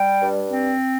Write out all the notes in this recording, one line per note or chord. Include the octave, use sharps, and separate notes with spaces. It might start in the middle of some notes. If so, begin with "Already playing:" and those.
Already playing: G3 G5
G2
C4